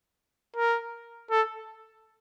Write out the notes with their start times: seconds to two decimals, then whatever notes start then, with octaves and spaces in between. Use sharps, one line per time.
0.56 A#4
1.31 A4